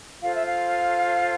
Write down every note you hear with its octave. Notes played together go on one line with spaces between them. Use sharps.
F4 A4 C5 F5
E5
F5